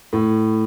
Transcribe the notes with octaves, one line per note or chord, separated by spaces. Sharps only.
A2